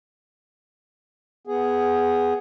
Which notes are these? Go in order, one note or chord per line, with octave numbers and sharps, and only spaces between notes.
B3 G#4